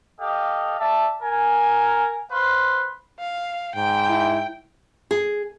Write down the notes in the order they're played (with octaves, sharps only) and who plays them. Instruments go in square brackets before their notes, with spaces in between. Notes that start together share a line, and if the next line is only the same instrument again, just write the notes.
[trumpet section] G4 A4 D#5 F5
D5 E5 A5
A#4 G#5
B4 C5 F5 C6
[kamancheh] F5
[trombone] G#2 [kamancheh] G5
[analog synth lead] E4
[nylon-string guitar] G#4